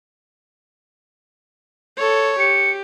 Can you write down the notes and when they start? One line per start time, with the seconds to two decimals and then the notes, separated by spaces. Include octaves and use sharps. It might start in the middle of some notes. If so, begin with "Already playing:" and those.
1.97 A4 C#5
2.39 G4 C#7